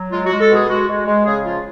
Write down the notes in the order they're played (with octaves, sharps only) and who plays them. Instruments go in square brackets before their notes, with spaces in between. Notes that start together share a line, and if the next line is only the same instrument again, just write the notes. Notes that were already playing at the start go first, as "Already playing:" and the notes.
Already playing: [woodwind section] F#3
G#3 F4
F#4
G#3
A4
B2 G#4
G#3 F#4
G#3
G#3
C#3 G#4
F3 F4